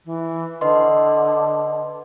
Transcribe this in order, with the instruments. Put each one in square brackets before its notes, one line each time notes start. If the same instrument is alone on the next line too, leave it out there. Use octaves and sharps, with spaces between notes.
[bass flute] E3
[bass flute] D3 [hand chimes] B4 D#5 C6